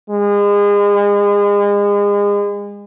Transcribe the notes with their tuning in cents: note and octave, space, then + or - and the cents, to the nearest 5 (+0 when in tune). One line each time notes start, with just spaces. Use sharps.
G#3 -35